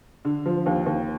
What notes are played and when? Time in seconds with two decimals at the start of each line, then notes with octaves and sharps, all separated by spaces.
0.25 D3
0.46 F3
0.66 D#2
0.86 D#2